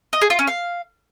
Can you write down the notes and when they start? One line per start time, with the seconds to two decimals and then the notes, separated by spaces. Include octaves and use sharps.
0.13 D#5
0.21 G#4
0.30 F4
0.39 C#4
0.47 F5